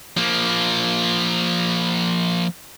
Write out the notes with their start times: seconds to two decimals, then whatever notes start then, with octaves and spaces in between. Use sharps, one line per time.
0.17 F3 A#3